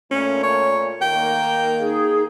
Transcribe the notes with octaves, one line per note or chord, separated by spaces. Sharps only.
A#2 A3 C#4
C#5
D#3 A#3 G5
D#4 G#4